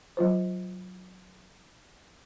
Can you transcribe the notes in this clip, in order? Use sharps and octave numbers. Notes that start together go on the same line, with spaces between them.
F#3 F4 C5